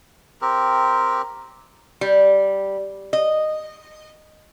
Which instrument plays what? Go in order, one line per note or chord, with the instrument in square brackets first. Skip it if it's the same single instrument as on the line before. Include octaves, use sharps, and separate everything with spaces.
[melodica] C4 G4 A#4
[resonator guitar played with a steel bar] G3
D#5